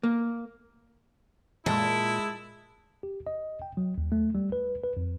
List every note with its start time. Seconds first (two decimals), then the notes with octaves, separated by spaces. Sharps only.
0.03 A#3
1.66 A#2 G#3 E4 A5
3.03 G4
3.27 D#5
3.62 G5
3.77 F#3
3.98 D#2
4.12 A3
4.35 G3
4.52 B4
4.84 B4
4.97 F2